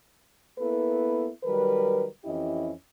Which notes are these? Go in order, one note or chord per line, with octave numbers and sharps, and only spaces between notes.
A#3 B3 E4 A4 B4
D#3 F#3 G3 A#4 B4
F2 E3 C#4 E4 G4 D#5